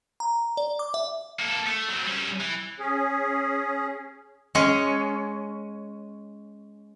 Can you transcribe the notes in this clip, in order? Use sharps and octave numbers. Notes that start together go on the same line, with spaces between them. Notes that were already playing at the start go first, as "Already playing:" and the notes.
A#5
D5
D6
E5
A#3 A4
A3
F#3 C4
G3 C#4
E3
C#4 G#4
G#3 C#4